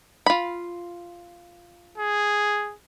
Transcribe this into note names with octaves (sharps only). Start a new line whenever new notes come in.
F4 B5
G#4